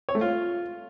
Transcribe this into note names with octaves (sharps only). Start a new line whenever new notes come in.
C#5
A3
F4